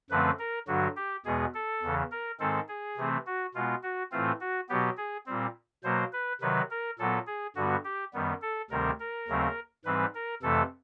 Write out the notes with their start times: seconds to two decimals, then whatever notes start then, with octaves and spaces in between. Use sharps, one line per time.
0.10 F#2 D3 F3 A3 C4 B4
0.39 A#4
0.68 G2 D3 F#3 F#4
0.96 G4
1.25 E2 B2 G#3 B3 G#4
1.54 A4
1.82 E2 C#3 E3
2.11 A#4
2.40 G#2 D#3 G#3 C4 A4
2.68 G#4
2.97 C3 E3 A3 C4
3.26 F#4
3.54 B2 G#3 B3 F4
3.83 F#4
4.12 A2 E3 A3 C4 F4
4.41 F#4
4.69 B2 F#3 B3 G4
4.97 G#4
5.26 A#2 G3 C4
5.84 B2 F#3 A#3 C5
6.13 B4
6.41 C3 D#3 F#3 B4
6.70 A#4
6.99 A#2 F#3 B3 A4
7.27 G#4
7.56 G2 D3 G3 B3 F#4
7.85 G4
8.13 F#2 D#3 G3 B3
8.42 A4
8.70 D2 C3 D#3 G3 C4 A#4
9.00 A#4
9.28 D#2 C#3 F#3 A3 C4
9.85 G#2 E3 G3 C4 B4
10.15 A#4
10.42 F2 C3 E3 A3 A4